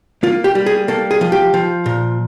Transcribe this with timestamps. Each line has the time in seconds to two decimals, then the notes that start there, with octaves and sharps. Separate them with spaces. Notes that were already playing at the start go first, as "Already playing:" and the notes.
0.23 A#3 F4
0.44 G4
0.55 G3
0.66 G#4
0.88 A#3 A4
1.11 G#4
1.21 F3
1.32 G4
1.54 F3
1.86 A#2